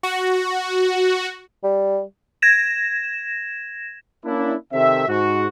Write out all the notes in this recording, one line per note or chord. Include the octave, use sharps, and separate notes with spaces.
F#4
G3
G#6 A#6 E7
A#3 C#4 D4 E4
C3 D#3 C4 A4 E5
G#2 F#4